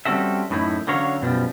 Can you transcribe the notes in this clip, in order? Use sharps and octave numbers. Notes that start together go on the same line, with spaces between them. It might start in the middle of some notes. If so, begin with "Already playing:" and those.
G3 C4 C#4 F#4 A4 E5
F#2 A2 A3 B3 D#4 E4
D3 F#3 C#4 C#5 F5 A#5
F#2 B2 F3 G3